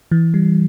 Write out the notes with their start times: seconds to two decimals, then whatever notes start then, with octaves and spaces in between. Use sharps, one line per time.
0.11 E3
0.34 G3